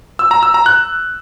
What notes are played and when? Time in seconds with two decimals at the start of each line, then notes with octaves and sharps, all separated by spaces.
0.19 E6
0.31 A#5
0.43 E6
0.54 A#5
0.66 F#6